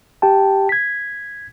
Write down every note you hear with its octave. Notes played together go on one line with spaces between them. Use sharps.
G4 G5 A5
G#6 B6